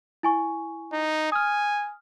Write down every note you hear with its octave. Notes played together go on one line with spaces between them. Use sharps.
E4 G#5 C#6
D#4
G#5 D#6 F6